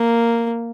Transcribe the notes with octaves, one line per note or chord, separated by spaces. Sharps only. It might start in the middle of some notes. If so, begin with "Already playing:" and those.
Already playing: A#3